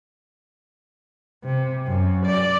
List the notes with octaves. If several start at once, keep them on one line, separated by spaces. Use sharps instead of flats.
C3
F#2
D5